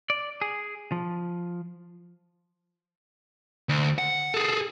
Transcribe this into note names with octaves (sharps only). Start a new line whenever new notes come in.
D5
G#4
F3
D2
F#5
G#4 A4